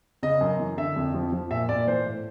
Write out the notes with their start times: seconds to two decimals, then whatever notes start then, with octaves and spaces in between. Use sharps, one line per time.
0.23 C#3 D#5
0.41 F#2
0.59 E3
0.77 D3 E5
0.96 F2
1.14 F3
1.32 F3
1.51 A#2 E5
1.69 A#2 D5
1.87 E3 C5
2.06 A2